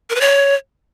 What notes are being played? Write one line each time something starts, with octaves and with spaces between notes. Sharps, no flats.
A#4
B4
C#5